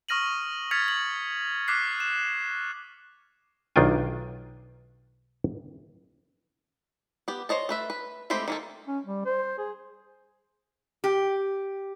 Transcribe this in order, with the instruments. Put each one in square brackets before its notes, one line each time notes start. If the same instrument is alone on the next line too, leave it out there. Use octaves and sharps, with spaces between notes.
[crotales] C#6 D#6 F6 A#6 D#7 F#7
F6 G#6 A6 B6 C#7 F7
F#7
D6 F6 F#6 B6 C7
E7
[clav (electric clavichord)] B1 D#3 D4 F4 G5 G#5
[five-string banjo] B3 G4
C5 C#5 D#5 A5
A3 B4 E5
B4
G#3 A3 C4 G4 B5
D#3 A#3 A4
[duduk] C#4
G3
C5
G#4
[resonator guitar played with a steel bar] G4